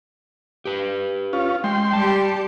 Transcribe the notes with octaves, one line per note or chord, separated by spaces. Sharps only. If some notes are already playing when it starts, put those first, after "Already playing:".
G4 B4
C#4 F4
G#3 G5 C6
G3 G4 A5